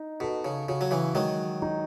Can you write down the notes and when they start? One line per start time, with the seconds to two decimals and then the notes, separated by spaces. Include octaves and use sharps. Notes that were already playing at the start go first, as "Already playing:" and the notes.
Already playing: D#4
0.20 B2 A4
0.45 C#3
0.69 C#3 F#4
0.81 F#3
0.91 C#3 E3
1.14 D#3 F#3 G#3
1.62 D#4